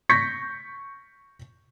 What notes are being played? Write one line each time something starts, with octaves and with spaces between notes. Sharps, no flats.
C#6 G6 A#6 B6 C#7